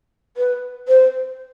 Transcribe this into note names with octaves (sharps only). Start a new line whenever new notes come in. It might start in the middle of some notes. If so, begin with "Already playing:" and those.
B4
C5